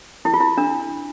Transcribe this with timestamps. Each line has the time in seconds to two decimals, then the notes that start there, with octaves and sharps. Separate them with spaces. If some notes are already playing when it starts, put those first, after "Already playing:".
0.25 E4
0.34 F4
0.40 E4
0.58 D4